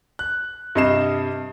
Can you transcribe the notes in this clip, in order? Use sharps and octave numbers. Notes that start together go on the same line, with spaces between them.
F#6
G2 C3 D#5 C7 E7